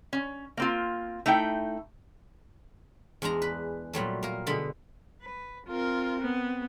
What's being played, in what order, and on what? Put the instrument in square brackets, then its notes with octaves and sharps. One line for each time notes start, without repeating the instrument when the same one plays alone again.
[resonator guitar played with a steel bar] C#4
A#3 C4 F4
A3 D#4 E4 G5
[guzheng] E2 G#3 D4 A#5
B4
A#2 F#3 G3 A3
A#3 A#4
B2 D3 G#3 B5
[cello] B4
[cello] C4 [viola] F4 A#4
[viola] B3